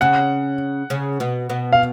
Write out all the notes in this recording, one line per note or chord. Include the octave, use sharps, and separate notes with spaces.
C#3 C#4 F#5
C#3 C#4
B2 B3
B2 B3
F5